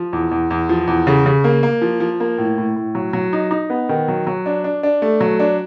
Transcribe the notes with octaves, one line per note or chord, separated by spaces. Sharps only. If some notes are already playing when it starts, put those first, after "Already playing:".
Already playing: F3
E2
E2
E2
F3
E2
C#3
C#3
A#3
A#3
F3
F3
A#3
A2
A2
A2
F#3
F#3
D#4
D#4
B3
D#3
F#3
F#3
D4
D4
D4
A3
F#3
D4